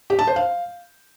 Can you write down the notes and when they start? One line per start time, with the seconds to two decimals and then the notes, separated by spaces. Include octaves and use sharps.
0.10 G4
0.19 A5
0.27 C5
0.36 F5